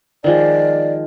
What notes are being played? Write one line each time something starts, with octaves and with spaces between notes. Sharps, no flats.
D#3 F3 G#3 D5